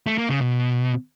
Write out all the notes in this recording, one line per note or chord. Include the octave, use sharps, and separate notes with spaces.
A3
A#3
C#3
B2